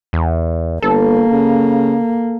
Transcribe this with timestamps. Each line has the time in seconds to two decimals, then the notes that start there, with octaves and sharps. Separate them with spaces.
0.13 E2
0.82 G1 A#3 A4
1.31 C#3